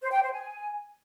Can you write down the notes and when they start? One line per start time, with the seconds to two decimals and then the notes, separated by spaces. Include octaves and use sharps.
0.01 C5
0.11 G5
0.22 C5
0.32 G#5